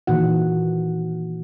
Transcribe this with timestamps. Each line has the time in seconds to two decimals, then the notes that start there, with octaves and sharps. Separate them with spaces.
0.07 A#2 D#3 E3 F#4 F#5